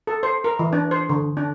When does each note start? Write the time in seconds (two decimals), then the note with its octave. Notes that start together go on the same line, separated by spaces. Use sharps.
0.07 A4
0.23 C5
0.44 A#4
0.59 E3
0.73 D4
0.91 C5
1.09 D3
1.37 D4